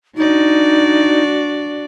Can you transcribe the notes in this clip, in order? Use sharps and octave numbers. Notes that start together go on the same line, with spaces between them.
D4 D#4 F#4 D5